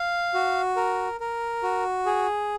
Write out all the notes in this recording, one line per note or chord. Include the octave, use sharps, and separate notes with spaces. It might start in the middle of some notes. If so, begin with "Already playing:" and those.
Already playing: F5
F#4
A#4
A#4
F#4
G#4